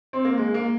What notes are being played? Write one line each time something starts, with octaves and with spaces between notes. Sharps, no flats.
C4
A#3
G#3
A#3